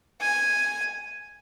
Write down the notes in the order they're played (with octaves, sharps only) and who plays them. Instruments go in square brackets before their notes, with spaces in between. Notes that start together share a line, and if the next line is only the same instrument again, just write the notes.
[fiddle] G#5